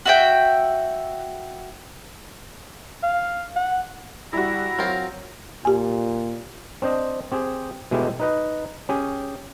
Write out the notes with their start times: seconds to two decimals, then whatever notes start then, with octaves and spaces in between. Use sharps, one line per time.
0.05 F#4 E5 G5
3.03 F5
3.56 F#5
4.33 G3 E4 F#4 A#5
4.79 F#3 C4 F4 A#4
5.65 A#2 G4 G#5
6.82 C4 D4 C5 D#5
7.32 C4 G4 G#4
7.91 B2 G#3 A3 E4 G4
8.20 D#4 B4 D#5
8.89 C#4 G4 G#4